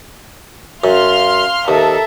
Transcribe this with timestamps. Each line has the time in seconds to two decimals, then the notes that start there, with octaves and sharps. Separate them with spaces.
0.84 F#2 F5 C6 F6
1.68 D#2 A4 A#4 E5